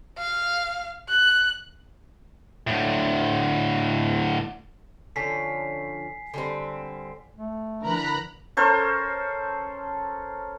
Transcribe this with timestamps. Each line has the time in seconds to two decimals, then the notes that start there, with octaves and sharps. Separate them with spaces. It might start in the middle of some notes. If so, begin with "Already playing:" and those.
0.18 F5
1.09 F#6
2.67 A2 D3
5.16 D3 F3 C#4 G#5 B6 C7
6.34 D3 G3 C4
7.36 A3
7.82 D3 E3 A#4 A#5 B5 F#6
8.57 C#4 A4 A#4 C5